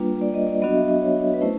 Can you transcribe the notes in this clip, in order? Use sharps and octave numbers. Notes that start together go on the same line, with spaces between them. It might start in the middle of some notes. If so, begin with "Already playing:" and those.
Already playing: G3 A#3 D4 F4 B4
D5
D#5
D5
F#3 B3 D4 F#4 D#5
E5
D#5
C#5
B4
A3 C#4 E4 C5